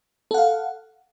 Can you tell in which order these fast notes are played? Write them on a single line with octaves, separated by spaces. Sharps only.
A4 F#5 F5